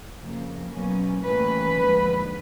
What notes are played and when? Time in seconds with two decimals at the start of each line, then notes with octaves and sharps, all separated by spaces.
0.19 F2 C#3 F3 A#3
0.70 B2 F#3 A#3 C#4
1.23 A2 E3 G3 A#3 C#4 B4
1.75 D#2 D3 F3 G#3